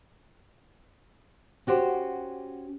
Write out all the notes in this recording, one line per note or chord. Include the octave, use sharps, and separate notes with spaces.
C#4 F#4 G4 C5